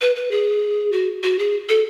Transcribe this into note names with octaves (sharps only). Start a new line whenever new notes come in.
B4
B4
G#4
F#4
F#4
G#4
A4